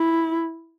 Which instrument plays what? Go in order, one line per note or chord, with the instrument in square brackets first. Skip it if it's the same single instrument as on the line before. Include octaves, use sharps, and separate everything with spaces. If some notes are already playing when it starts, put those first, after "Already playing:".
Already playing: [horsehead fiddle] E4